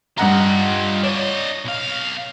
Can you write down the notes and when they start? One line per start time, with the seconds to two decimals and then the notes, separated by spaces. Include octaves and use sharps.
0.18 G2 F4 D#5 F#5 A#5
1.03 D4 C#5 D#5
1.65 B1 F5